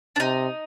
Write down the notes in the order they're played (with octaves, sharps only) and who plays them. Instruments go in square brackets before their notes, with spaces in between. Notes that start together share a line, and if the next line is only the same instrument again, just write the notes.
[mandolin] D4
[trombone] C3 [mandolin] D#4